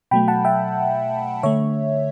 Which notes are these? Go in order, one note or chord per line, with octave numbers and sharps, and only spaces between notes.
B2 F#3 A3 G5 B5
F#5 A5
E5 G5
D3 A3 C#5 E5